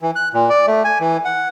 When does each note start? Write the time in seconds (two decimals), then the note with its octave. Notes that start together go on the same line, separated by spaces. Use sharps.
0.01 E3
0.16 F#6
0.34 A#2
0.50 D5
0.67 A3
0.85 G#5
1.00 E3
1.25 F#5